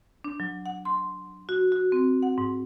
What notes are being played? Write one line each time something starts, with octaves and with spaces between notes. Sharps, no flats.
D4
F#3
F#5
C6
F#4
F#4
C4
F#5
G#2